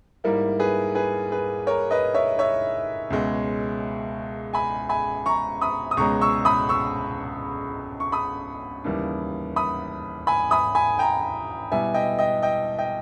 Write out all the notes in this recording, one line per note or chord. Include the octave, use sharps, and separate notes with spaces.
G#2 G3 A#3 E4 A#4
G#4 B4
G#4 B4
G#4 B4
A#4 C#5
B4 D#5
C#5 E5
C#5 E5
C#2 B2 G#3
G#5 B5
G#5 B5
A#5 C#6
B5 D#6
D#6
C#2 B2 G#3 C#4 A#5 C#6
C#6 E6
B5 D#6
C#6 E6
C#6
B5 D#6
D#2 C#3 E3 G3 A#3
B5 D#6
G#5 B5
B5 D#6
G#5 B5
G5 A#5
B2 G3 B3 E4 E5 G#5
D#5 G5
D#5 G5
D#5 G5
D#5 G5